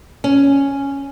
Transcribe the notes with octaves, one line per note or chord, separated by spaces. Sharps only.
C#4